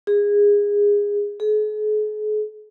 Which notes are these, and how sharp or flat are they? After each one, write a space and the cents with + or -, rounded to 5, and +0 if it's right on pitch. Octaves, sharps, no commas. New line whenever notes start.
G#4 -20
G#4 +45